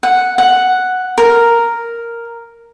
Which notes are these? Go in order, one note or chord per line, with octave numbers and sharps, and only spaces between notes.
F#5
F#5
A#4